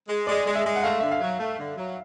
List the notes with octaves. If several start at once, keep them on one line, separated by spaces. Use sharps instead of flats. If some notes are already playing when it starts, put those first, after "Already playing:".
G#3
G#3 D5
G#3
E5
G#3
F#5
A3 F5
D3 E5
F5
F#3
A3
D3
F#3